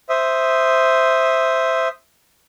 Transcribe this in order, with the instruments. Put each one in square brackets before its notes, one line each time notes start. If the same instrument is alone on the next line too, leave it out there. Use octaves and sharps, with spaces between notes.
[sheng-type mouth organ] C5 E5 D#6